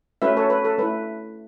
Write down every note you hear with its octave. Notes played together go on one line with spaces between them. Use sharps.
A3 C#4 F#4 B4 E5
A4 C#5
B4
A4
A3 E4 B4